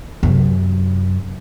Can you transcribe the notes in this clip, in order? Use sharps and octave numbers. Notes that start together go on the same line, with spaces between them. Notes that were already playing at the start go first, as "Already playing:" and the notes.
F#2 C3